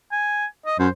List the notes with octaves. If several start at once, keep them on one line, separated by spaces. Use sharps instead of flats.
G#5
D#5
F#2 C5